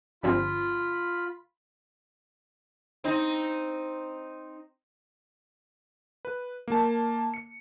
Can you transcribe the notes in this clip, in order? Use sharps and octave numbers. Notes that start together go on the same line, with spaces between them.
G1 F3 C4 F4 B5
C4 D#4
B4
A#3 A5
C#7